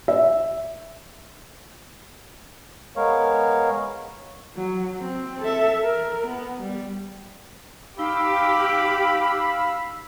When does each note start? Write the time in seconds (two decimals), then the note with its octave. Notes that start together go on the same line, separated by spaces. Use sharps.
0.08 E5
2.96 G#3 B3 A#4 C#5 F5
4.55 F#3
5.00 C4
5.41 A4 E5
5.83 A#4
6.26 B3
6.61 G3
7.99 D#4 G4 F5 B5 E6